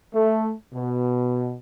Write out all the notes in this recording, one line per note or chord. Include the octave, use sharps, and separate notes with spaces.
A3
B2